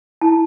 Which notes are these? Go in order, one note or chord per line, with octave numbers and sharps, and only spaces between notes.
E4 A5